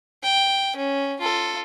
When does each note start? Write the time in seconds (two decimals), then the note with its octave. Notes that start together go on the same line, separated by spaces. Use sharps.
0.23 G5
0.76 C#4
1.21 F4 A4